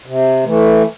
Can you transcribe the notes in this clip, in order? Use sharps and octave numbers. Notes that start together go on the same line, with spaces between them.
C3
E3 A3